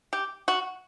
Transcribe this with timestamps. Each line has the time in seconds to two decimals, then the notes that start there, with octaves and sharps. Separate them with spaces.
0.13 G4
0.48 F#4